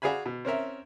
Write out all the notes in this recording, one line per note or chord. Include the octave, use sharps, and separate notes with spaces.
F#4 G#4 D5 F5 G#5 B5
B2
C4 C#4 A#4 E5